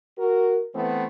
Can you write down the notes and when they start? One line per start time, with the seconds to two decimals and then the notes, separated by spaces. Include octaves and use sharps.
0.18 F#4 A#4
0.75 E3 A3 B3 C4